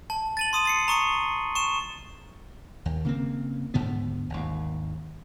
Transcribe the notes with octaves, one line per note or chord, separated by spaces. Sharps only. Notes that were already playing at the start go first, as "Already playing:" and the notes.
A5
A6 D#7 F#7
C6 D#6 D#7
A6 C7 C#7
A#5 C#6 D#6 C#7
C#6 E7
D#2
C#3 A#3 C4
D2 G#2 D3 B3
G#1 D#2